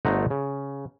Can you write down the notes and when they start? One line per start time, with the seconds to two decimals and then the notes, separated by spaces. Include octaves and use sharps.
0.05 G1 A3 C5 D#5 F#5 A#5
0.30 C#3